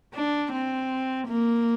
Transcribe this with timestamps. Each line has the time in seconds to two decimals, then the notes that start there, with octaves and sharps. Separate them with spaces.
0.15 D4
0.52 C4
1.27 A#3